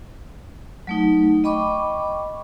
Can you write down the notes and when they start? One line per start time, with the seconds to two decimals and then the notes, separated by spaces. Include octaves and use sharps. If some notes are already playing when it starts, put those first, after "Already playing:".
0.87 F#3 A3 D#4
1.44 D#5 G5 B5 C#6 D6